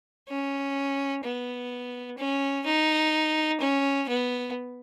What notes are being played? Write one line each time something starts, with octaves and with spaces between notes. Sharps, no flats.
C#4
B3
C#4
D#4
C#4
B3